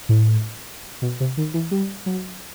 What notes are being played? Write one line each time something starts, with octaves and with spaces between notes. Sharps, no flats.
A2
B2
C3
D#3
E3
G3
F#3